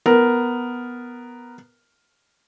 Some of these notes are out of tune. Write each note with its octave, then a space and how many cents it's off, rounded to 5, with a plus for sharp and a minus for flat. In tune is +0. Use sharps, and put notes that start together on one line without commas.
B3 +0 A#4 +0